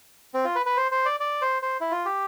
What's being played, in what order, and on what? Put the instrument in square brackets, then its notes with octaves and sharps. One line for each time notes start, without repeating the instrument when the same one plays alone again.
[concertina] C4
F4
B4
B4
C5
C5
D5
D5
C5
C5
E4
F4
G4